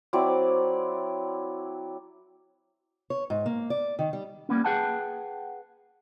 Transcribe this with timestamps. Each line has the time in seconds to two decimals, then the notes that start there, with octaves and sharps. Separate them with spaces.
0.13 F#3 C4 E4 D5
3.10 C#5
3.30 G#2
3.46 A#3
3.70 D5
3.99 D#3
4.13 G3
4.49 G3 A#3 B3 C#4
4.65 G#4 B4 F#5 G5 A5